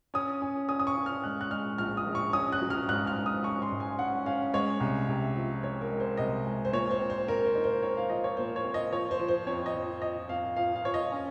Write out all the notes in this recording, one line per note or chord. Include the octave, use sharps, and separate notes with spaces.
C#4 D#6
C#4
C#4 D#6
D#6
C#6
C#4
F6
G#3 F#6
F#6
G#3 F6
A#1 F6
D#6
A#1
C#6
C#4 D#6
F#6
F#3
F6
G#2 F#6
F6
G#2
D#6
C#4 C#6
C6
G#2
G#5
C#4 F#5
C#4 F5
G#3 C#5
C2
C3
F3
G#3 C#5
A#4
G#3
C5
C2 D#5
G#3
C5
A#2 C#5
C5
C4
C5
C4 A#4
C5
D#4
C5
C4 C#5
F5
F3 D#5
C#5
A#2 C5
C#5
C4
D#5
F3 C#5
C5
F3
C5
F2 C#5
D#5
F3
F3 D#5
F2 F5
F3 F5
F5
F3 C#5
D#5
C#4